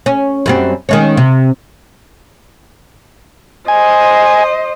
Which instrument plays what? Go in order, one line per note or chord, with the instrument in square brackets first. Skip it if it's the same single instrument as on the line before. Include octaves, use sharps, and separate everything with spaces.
[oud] C#4
F#2 G3 C4
D#3 G#3 C#4
C3
[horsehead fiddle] C5 D#5 [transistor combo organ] G#5